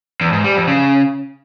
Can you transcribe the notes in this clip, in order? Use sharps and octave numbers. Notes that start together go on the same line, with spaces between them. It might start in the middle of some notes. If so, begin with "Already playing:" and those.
E2
G#2
G3
F2
C#3